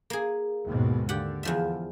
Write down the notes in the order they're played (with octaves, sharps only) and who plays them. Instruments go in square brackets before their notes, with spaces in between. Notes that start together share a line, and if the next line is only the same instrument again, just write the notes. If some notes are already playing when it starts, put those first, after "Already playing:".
[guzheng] A#3 G#4
[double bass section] D#2 G#2 B2
[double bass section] D3 [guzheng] G4 F#5
[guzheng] E2 F3 E5